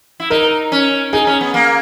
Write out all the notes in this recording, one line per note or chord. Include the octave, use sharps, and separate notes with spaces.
E4
D#4 A#4
C#4
D#4 G#4
C#4
B3
A#3